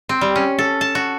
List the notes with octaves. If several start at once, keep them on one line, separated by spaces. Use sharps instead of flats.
C4
G3
C#4
A4
A5
F#4